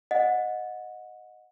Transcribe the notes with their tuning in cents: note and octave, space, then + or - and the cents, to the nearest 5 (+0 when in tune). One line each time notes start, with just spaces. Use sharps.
D#5 +0 F#5 -25